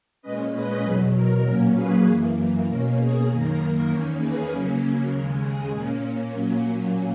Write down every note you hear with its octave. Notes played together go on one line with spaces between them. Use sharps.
A#2 G#3 C#4 B4 D#5
B4 D#5
E2 B2 F#3 G#4 B4
A#4
A#2 F#3 A#3 C#4 A#4
G#4 B4
F#2 E3 A#3
B2 A#3 C#4 A#4
G#4
F#2 D#3 A#3 A#4
E2 D#3 A#3 C#4 A#4 C#5
G#4 B4
C#3 F#3 A#3 C#4
D#2 C#3 G#3 A#4
G#4
A#2 A#3 C#4
A#2 F#3 A#3 C#4